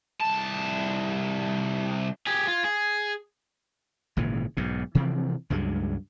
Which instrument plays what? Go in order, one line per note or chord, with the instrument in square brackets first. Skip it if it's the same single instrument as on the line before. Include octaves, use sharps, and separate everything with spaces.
[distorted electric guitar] C2 A5
[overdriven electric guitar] G4 G#4 [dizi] G#6
[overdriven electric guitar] F4
G#4
[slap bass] G#1 A#2 C#3 E3
B1 G#2 B2
C3 E3 F3 C4
C#2 G2 F#3 G#3